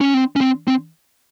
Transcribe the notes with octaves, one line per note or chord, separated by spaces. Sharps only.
C#4
C4
C#4
C4
C4